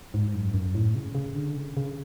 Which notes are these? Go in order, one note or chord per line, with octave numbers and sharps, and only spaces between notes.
G#2
F#2
F#2
A2
C#3
C#3
D3
C#3
C#3